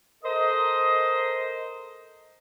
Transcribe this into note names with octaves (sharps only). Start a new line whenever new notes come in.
A4 A#4 C5 D#5